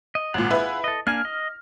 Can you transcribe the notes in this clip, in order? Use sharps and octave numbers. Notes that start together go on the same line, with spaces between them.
D#5
G#1 A#2 F4 G#4 F#5
E4 B4
A4 D#5
A#3 D4 G#5 F6
D#5